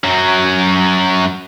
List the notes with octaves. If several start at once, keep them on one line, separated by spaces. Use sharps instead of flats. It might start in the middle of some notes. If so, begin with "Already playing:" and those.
F#2 F#3